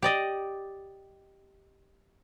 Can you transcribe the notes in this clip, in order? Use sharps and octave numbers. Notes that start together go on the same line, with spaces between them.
G4 D5 D#5